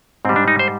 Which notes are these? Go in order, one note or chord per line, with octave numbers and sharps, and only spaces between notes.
G#2 G3 C4
D4
D#4
C5